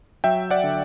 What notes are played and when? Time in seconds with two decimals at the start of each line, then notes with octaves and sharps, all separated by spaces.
0.24 F#3 E5 G5
0.51 D5 F#5
0.64 D3